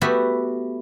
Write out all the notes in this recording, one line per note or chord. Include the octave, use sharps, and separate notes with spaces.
A3 B3 F#4 G4 E5